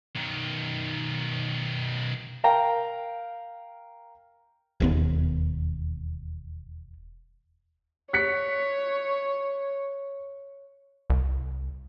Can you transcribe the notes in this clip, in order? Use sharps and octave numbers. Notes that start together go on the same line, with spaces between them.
B1 D#3
A#4 F5 G5 A#5
E1 D#2 B3
C#5 F#6 B6 C#7
C2